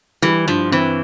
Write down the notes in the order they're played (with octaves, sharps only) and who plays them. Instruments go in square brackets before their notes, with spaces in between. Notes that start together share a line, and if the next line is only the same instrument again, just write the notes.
[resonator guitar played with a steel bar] E3 [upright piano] G3
[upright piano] G2 [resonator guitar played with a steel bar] F3
[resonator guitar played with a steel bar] E3 [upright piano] C4